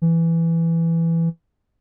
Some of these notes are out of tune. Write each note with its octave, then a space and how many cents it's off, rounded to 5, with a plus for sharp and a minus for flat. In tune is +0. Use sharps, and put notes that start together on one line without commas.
E3 +10